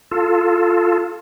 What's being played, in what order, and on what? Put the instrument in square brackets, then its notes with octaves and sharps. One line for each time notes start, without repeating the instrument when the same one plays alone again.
[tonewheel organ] F4 A4